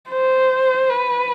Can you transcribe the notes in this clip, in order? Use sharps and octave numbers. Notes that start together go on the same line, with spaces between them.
C5
B4